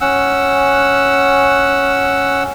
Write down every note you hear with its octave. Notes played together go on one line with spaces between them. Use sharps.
C#4 F#5 E6